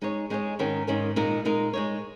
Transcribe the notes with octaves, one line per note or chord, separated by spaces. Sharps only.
G#3 D#4 G#4 C#5
G#3 D#4 G#4 C#5
G#2 D#3 C#4 A#4
G#2 D#3 C#4 A#4
A#2 G#3 D#4 A#4
A#2 G#3 D#4 A#4
G#3 D#4 C#5